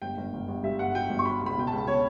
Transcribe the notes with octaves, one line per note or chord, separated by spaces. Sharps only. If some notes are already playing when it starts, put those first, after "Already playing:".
G1 G5
G1
G1
G1
G2 E5
G1 F#5
F#3 G5
G1
C#6
F#3 B5
C#2
B5
B2 G5
A5
C#2
B2 C#5